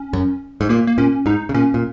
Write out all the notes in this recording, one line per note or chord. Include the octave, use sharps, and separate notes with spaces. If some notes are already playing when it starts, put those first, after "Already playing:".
Already playing: C#4
F#2
G#2
A#2 A#3
A#3
A#2 C#4
G#2 D#4
C#3
A#2 C#4
A#2